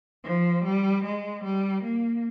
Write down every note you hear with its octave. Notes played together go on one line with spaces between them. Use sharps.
F3
G3
G#3
G3
A#3